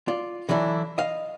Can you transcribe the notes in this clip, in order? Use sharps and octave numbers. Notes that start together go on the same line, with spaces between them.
F4 D5
D3 E3 F#3 D4 E4
D#5 F5